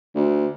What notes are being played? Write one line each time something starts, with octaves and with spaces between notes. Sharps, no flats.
D2